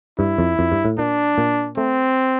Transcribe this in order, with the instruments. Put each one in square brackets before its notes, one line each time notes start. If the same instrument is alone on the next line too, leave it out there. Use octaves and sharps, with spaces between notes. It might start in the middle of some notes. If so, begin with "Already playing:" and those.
[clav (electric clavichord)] G2 [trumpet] E4
[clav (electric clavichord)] F2
F2
G2
A2
[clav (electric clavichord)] A#2 [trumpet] D4
[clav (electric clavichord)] A#2
[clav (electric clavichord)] A3 [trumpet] C4